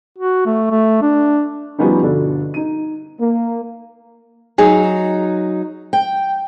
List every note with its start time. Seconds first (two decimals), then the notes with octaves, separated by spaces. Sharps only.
0.19 F#4
0.46 A3
0.71 A3
1.02 D4
1.79 F3 G3 B3 C#4 D#4
2.02 G1 B2 D4 A4
2.54 D#4 D#7
3.20 A#3
4.58 F#3 D#4 G#4
5.93 G5